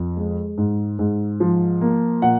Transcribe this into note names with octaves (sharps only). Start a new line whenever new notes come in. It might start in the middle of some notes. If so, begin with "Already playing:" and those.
Already playing: F2
G#3
G#2
G#2
F3
A#3
A#2 F#5